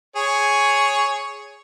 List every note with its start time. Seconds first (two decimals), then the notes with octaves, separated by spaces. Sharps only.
0.16 G#4 C#5